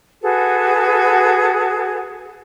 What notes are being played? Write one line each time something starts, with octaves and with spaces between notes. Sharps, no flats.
F#4 G#4 A4 B4